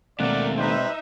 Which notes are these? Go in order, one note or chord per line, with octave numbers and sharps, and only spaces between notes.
D#2 B2 G#3 A3 C4 A#4 D5 F#5
G3 D#4 B4 C5 E5